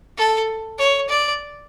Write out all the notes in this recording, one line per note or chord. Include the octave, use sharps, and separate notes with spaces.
A4
C#5
D5